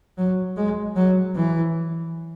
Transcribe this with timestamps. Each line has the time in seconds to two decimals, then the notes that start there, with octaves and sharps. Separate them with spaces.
0.18 F#3
0.57 G#3
0.96 F#3
1.35 E3